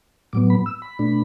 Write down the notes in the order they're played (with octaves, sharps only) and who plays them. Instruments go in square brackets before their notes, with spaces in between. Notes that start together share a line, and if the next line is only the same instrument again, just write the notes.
[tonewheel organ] A2 F#3 B3 D6
B5
E6
B5
B2 A3 D4